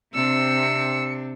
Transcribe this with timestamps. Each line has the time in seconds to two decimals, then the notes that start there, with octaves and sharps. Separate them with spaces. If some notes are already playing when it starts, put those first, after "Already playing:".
0.15 C3 C4 D4 E6 C#7